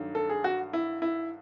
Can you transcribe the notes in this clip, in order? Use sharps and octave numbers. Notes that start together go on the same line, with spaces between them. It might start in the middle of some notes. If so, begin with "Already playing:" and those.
Already playing: G2 D#3 F#3 A3
A4
G#4
F#4
E4
E4